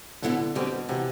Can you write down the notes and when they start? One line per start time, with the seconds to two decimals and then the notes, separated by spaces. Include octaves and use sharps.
0.22 B2 D3 B3 E4 A4
0.55 B2 D3 G3 C4 G4
0.73 B2
0.89 C3 E3 B3